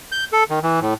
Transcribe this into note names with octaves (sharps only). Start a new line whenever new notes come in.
G6
A4
D#3
E3
A2